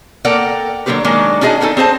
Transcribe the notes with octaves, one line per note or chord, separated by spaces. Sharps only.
A#3 A4 A#4 D5 F#5 G5
D3 F#3 A#3 C4 G4 B4
D#3 F#3 G#3 A#3 D4
C#4 D#4 F#4 G#4 D#5 A5
B3 C#4 D#4 A4
C4 G#4 C5 A5